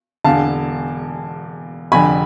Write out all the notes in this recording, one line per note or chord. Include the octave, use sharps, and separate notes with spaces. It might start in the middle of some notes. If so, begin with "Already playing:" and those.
E1 E2 D3 F5 A5
F1 F2 D3 G#5 B5